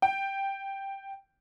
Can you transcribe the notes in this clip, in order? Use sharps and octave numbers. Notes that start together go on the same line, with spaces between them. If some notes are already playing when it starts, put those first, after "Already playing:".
G5